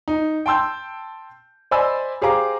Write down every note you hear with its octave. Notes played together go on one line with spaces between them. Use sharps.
D#4
G5 A5 C6 E6 G6
C5 D5 D#5 G#5 B5 E6
G4 G#4 C5 F5 A#5 D6